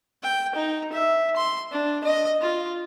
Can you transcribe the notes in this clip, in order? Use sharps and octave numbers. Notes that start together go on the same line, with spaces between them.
G5
D#4
E5
C6
D4
D#5
F4